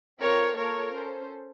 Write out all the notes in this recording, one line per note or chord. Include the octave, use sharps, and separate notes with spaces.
C4 F4 A4 A#4 C#5
A#3 F4 A4 A#4 C#5
C#4 A4 C5